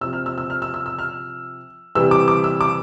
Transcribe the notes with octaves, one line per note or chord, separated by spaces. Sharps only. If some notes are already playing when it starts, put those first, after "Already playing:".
C3 F3 E6
F6
E6
E6
F6
E6
E6
E6
F6
C3 E3 G3 E6
D6
D6
E6
D6